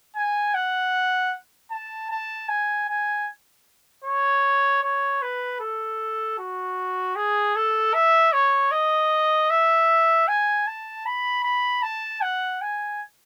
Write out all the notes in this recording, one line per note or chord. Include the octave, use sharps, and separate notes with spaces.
G#5
F#5
A5
A5
G#5
G#5
C#5
C#5
B4
A4
F#4
G#4
A4
E5
C#5
D#5
E5
G#5
A5
B5
B5
A5
F#5
G#5